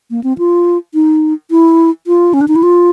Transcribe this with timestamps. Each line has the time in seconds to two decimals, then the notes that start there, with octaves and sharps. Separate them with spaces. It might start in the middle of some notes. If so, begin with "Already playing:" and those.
0.11 A#3
0.23 C4
0.38 F4
0.94 D#4
1.51 E4
2.07 F4
2.34 C#4
2.41 D4
2.48 D#4
2.56 E4
2.63 F4